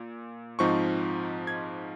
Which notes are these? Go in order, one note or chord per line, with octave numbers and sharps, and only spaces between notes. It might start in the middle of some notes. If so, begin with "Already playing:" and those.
Already playing: A#2
G#2 F3 C4 D#4 C#6
G#6